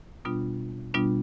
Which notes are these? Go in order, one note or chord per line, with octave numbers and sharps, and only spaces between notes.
B2 G3 B3 D4 F4
B2 G3 B3 D4 F4